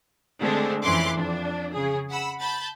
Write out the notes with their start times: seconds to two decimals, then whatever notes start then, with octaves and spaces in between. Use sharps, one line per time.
0.40 D3 G#3 A3 C4 D4
0.82 F2 E3 C#4 C6 D6 F#6
1.14 F2 D4
1.73 C#3 G#4
2.09 F#5 B5 E6
2.41 A5 B5 G6 A6